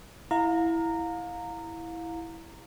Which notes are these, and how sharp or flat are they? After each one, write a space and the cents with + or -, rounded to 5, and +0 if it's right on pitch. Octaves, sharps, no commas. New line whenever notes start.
E4 +0 F5 +30 A#5 -15